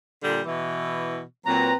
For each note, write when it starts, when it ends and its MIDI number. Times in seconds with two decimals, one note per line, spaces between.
0.23 0.40 46
0.23 0.40 50
0.23 0.40 55
0.44 1.22 47
0.44 1.22 52
1.46 1.71 46
1.46 1.71 54
1.46 1.76 60
1.46 1.76 71
1.46 1.76 82